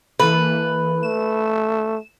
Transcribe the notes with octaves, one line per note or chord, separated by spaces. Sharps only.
E3 A#3 A4 B4
A3 E7